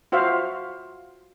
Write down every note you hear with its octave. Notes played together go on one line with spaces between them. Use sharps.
F4 F#4 C5 E5 F5